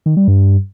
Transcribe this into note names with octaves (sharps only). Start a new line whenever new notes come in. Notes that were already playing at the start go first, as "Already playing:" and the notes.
D#3
G3
G2